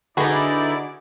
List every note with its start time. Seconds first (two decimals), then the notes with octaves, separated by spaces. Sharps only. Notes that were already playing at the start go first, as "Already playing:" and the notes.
0.17 D3 D#4 E4 F#4 G#4 B4 D5 B5